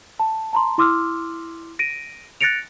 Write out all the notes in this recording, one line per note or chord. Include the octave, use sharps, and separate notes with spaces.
A5
A5 A#5 C6
E4 C6 D6 E6 F6
A#6 D7 D#7
F#6 A6 A#6 C#7 D7 F7